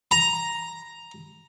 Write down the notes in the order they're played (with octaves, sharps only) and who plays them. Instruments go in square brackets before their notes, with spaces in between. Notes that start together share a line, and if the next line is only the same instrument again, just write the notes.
[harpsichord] A#5